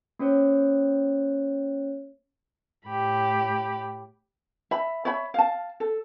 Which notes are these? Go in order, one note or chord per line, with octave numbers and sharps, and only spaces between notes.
A#3 C#4 C5 C#5
A2 G4 B5
E5 B5
C#5 E5 B5
F5 A5
A4